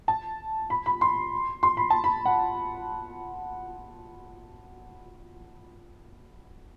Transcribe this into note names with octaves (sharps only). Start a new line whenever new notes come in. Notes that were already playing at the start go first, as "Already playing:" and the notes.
A5
B5
B5
C6
C6
B5
A5
B5
F#5